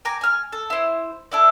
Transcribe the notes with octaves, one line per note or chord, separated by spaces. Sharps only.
G5 G#5 A#5 D6
G#5 F6
A4
E4 C5
D4 E4 A4